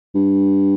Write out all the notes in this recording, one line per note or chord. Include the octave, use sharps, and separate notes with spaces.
G2